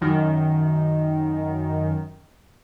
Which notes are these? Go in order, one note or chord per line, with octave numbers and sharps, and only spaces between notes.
F#2 D#3